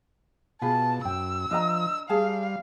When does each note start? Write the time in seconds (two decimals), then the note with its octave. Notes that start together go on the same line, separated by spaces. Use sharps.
0.62 B2 F4 G#4 B4 A5
1.05 F#2 G5 E6
1.51 F3 D4 D#5 A#5
2.10 G3 G#4 F5 A5